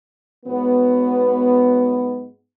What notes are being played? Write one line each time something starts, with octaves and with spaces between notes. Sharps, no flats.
G#2 F#3 B3